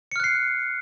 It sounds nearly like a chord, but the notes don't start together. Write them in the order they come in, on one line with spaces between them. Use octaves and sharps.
C#7 F6 F#6 C7